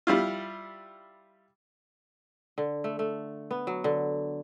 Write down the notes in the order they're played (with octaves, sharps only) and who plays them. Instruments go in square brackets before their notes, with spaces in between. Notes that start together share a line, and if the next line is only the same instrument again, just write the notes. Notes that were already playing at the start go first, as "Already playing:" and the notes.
[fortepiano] G3 E4 F4
[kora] D3
A3
A3
B3
F#3
D3